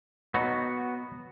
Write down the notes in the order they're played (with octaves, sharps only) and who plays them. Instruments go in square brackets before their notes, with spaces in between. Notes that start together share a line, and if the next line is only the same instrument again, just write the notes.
[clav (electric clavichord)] B2 F#3 D#4 [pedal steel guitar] B3 F#4